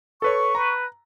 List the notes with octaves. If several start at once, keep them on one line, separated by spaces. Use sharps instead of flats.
A4 B4 C#5 C#6
B4 A#5